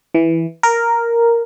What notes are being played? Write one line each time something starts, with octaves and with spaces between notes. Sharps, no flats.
E3
A#4